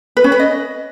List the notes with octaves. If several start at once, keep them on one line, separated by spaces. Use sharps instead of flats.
B4
C#4
B4
D#5